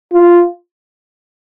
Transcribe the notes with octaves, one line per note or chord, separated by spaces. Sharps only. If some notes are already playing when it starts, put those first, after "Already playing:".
F4